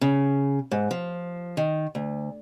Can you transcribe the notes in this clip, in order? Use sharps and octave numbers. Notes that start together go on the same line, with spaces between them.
C#3
G#2
F3
D#3
D2